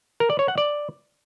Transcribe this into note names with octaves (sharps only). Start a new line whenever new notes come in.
A#4
D5
C#5
F#5
D5